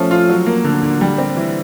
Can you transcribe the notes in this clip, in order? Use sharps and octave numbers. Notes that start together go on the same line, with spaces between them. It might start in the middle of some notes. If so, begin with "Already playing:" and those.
Already playing: F3 A3 C#4
F4
F#3
A#3
D3
D3
G3
C4
E3